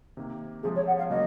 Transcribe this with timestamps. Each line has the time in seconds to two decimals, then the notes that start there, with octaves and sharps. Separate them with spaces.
0.17 C3 D#3 A#3
0.63 C3 F3 G#3 G#4
0.75 C#5
0.87 F#5
0.98 F5
1.10 C#3 F#3 A#3 D#5